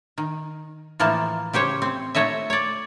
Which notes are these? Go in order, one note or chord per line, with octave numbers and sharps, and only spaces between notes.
D#3
A2 E3 F3 A#3 A5
C#3 G4 C5 C#5
C4
A#2 A3 C#5 D#5 E5
C#5 D5